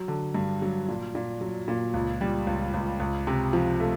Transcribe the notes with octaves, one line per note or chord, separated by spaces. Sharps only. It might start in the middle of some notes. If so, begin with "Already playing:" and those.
Already playing: F#3
D3
G2
F#3
A#2
A#2
F#3
A#2
C#2
G3
C#2
C#2
C#2
C3
F3
A3